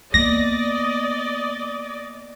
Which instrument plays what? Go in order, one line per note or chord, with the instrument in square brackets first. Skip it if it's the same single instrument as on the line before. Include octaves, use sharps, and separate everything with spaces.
[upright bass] A#3 B3 [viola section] D5 D#5 [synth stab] A#6